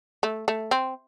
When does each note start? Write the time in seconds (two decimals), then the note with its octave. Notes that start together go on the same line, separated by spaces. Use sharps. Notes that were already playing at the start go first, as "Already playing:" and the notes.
0.23 A3
0.48 A3
0.71 C4